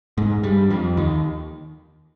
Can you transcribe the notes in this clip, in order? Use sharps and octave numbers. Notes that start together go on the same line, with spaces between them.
G#2 G#3
G2 G3
F2 F3
D#2 D#3